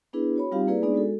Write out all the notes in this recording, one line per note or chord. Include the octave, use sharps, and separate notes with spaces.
B3 D4 E4 G#4 B4
F#4 C#5 B5
G3 C4 D#4 F4 G4 F5
A#3 E4 G#4 B4 D5
G#3 B3 D4 D#4 G#4 D5
G#3 F#4 A4